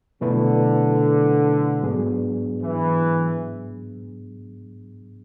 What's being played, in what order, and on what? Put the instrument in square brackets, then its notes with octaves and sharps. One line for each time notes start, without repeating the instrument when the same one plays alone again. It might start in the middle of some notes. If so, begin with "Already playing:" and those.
[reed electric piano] B2 F#3 A3 E4 B4 [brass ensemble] D3
[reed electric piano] G#2 F#3 B3 D4 G#4
[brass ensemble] E3